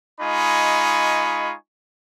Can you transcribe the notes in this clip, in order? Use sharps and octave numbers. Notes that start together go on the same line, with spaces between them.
G#3 D#4 F4 G#5 B5 C#6